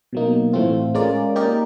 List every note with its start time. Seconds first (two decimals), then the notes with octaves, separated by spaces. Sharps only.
0.13 B2 F#3 A#3 D#4
0.53 A2 E3 A3 C4 F4
0.95 G#3 C#4 F4 A#4 D5
1.36 A#3 D#4 G4 A#4 D5